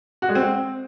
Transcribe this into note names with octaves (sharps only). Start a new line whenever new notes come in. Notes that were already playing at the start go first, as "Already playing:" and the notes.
F#4
G#3
C4